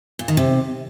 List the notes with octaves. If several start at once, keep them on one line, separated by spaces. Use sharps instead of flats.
A#2
D#3
C3